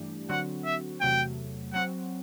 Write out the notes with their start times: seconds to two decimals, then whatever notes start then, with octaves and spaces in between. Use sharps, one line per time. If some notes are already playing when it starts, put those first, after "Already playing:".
Already playing: G2 E3 A3 D4 G4
0.29 D3 F#3 C4 F#4 F#5
0.65 E5
1.01 E2 C3 F#3 A3 G5
1.73 F#3 C4 F#4 F#5